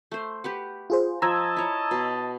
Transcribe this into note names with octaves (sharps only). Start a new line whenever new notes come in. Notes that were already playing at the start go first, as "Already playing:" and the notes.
A3 C5
G4 B4 F#5
F4 G#4 C5
F3 D#5 A5 A#5 E6 G#6
E4 C#5
B2